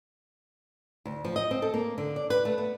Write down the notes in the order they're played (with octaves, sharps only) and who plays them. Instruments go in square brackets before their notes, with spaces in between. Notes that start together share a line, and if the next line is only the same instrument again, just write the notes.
[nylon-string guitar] D2
F3
D#5
C4
A4
A#3
D3
D5
B4
A3
B3